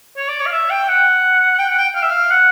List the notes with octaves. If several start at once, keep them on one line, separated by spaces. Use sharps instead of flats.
C#5
D5
C#5
F5
E5
G5
F#5
G5
F#5
G5
F5
E5
F5
F#5